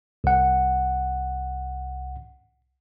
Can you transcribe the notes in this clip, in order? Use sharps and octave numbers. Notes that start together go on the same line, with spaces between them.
C2 F#5